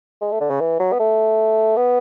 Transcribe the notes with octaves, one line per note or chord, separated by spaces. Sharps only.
G#3
A3
D3
C#3
E3
F#3
B3
A3
B3